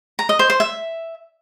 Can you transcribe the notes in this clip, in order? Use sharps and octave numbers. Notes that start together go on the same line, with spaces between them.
A#5
D#5
C5
C5
E5